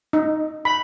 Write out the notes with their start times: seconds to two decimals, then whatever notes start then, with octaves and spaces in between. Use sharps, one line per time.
0.13 D#4
0.65 B5